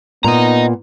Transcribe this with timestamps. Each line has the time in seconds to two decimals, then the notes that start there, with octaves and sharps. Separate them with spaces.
0.24 A#2 B3 D#5 A#5